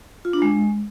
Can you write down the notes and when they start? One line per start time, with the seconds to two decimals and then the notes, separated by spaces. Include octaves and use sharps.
0.25 F4
0.33 D4
0.42 G#3